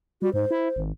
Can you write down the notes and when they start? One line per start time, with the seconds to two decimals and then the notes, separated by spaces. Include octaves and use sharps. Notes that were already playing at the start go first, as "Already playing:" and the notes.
0.22 G3 F#4
0.34 G#2 C5
0.51 E4
0.76 G#1